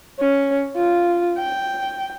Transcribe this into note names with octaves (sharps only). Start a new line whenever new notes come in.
C#4
F4
G5